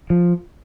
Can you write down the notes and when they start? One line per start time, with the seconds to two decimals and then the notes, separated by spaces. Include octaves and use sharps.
0.10 F3